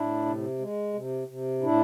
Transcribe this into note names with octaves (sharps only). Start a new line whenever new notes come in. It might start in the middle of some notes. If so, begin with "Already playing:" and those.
Already playing: A2 D4 E4
C3
G#3
C3
C3
A2 D4 E4